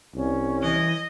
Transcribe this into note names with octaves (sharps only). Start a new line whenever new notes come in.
C2 C#4
E3 D#5